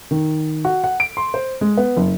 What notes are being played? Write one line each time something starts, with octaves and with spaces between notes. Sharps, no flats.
D#3
F#4
F#5
D7
C6
C5
G#3
B3
F#1